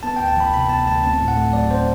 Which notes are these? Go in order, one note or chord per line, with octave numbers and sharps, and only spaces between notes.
B3 A5
D2 G5
A5
E3 B5
C3 B5
B3 A5
D2 A5
C4 A5
A2
F#5
A3
F#3 D5
C4 C5